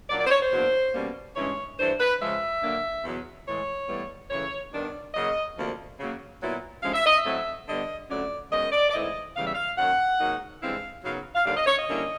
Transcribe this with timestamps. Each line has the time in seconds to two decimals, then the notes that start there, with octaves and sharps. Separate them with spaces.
0.09 A#2 F#3 A#3 D4 D5
0.20 D5
0.26 C5
0.31 C#5
0.41 C5
0.51 E2 B2 F#3 A#3 D4
0.93 B2 G3 A#3 C#4
1.35 G2 E3 G#3 C#4 C#5
1.78 G2 E3 A3 D4 C5
1.99 B4
2.20 C#3 F3 G#3 E5
2.62 D3 F#3 A#3 D4
3.03 E2 B2 F#3 B3
3.46 A2 E3 G#3 C#5
3.88 A2 E3 G3 B3
4.30 F#2 C#3 E3 A3 C#5
4.72 G2 D#3 G3 B3 D4 D5
5.14 C#3 F#3 A#3 D#5
5.57 D2 C3 F3 A#3 D4
5.98 C#3 F#3 A#3
6.40 A#2 F#3 B3 E4
6.82 D2 C3 F3 G#3 C#4 F5
6.94 E5
7.06 D#5
7.17 E5
7.25 A2 F#3 A3 C4
7.67 D3 G3 B3 D#5
8.09 F2 D3 F#3 A3 C#4 D5
8.51 F#2 D#3 G#3 B3 D#5
8.72 D5
8.89 D5
8.93 G#2 E3 A3 C4 E4 D#5
9.35 E2 C#3 E3 G3 F5
9.44 E5
9.54 F5
9.77 F#2 D#3 F#3 A#3 F#5
10.19 G#2 D#3 F#3 A#3 D#4
10.61 G2 E3 G#3 C4 E4 F5
11.04 F#2 C#3 F#3 B3 D#4 F5
11.35 F5
11.45 D#2 D3 G3 A#3 D4 F5
11.56 D#5
11.66 C#5
11.78 D#5
11.88 D3 G3 A#3 C#4 E4